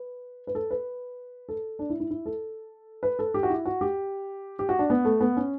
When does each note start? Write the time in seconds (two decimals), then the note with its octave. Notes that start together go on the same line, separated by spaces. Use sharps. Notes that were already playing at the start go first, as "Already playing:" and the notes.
Already playing: B4
0.47 B4
0.55 A4
0.71 B4
1.49 A4
1.79 D4
1.90 E4
2.00 E4
2.10 E4
2.26 A4
3.03 B4
3.19 A4
3.34 G4
3.43 F#4
3.49 E4
3.65 F#4
3.81 G4
4.59 G4
4.69 F#4
4.79 D4
4.90 B3
5.05 A3
5.20 B3
5.37 C#4